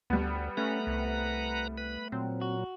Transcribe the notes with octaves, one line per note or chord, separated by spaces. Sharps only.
D2 G3 B3
A3 C#4 B4 F#5 A#5
C2
B4 B5
A#2 F#3 C4
F#4